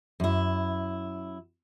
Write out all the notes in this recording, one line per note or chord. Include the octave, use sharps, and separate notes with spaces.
F#2 E4